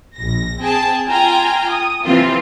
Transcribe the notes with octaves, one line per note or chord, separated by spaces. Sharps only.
A#1 A#6
C4 G#4 G5 A5
F4 G5 G#5 A#5
D#6
C3 E3 C4 F4